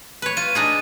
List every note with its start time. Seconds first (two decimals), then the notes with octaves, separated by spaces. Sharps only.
0.22 B4 C#5
0.37 F4 D#7
0.55 D4 D#4 G#4